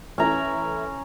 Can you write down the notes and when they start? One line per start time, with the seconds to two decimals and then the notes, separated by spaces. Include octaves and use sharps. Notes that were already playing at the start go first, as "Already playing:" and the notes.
0.18 E3 A3 C#4 E4 A#5